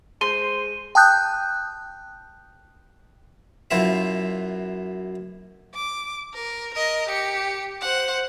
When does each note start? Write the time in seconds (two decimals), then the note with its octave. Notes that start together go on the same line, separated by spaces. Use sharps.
0.21 G#3 C5 C6 D#7
0.95 G5 A5 D#6 F#6 G6
3.71 F#2 B2 E4 F4 E5
5.75 D6
6.34 A#4
6.74 A#4 D#5
7.09 G4 C#7
7.81 C5 F#5